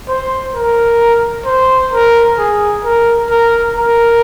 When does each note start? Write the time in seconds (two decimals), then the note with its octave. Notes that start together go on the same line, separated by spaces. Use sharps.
0.08 C5
0.54 A#4
1.46 C5
1.93 A#4
2.38 G#4
2.84 A#4
3.30 A#4
3.76 A#4